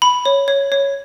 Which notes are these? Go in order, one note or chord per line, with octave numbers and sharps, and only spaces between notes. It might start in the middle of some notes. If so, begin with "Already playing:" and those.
B5
C#5
C#5
C#5